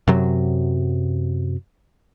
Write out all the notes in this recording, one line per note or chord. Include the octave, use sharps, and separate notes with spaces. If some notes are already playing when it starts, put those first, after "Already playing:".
F#2 C3 F#3